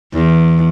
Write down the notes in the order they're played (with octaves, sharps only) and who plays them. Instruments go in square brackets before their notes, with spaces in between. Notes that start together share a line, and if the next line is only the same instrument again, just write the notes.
[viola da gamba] E2